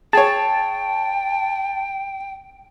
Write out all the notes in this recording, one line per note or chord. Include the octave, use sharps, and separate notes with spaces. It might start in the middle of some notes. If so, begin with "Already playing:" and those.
G#4 C#5 G5 A5